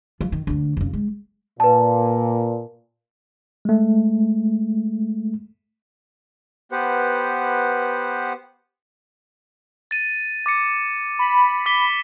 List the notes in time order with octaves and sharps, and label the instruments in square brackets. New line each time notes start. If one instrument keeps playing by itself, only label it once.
[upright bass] F3
D#3
D2 D3
F1 C#3
G#3
[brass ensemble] A#2 [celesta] B4 A5
[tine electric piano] G#3 A3
[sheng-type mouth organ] B3 G4 B4 C5 F#5
[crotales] A6 D#7
D6 A6 C#7
[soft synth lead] B5
[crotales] D6 B6 G7